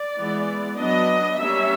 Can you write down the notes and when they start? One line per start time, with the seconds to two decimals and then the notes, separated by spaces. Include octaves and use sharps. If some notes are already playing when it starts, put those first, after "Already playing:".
Already playing: D5
0.18 E3 G#3 B3
0.78 F#3 B3 D4 D#5
1.39 G3 A#3 C#4 E5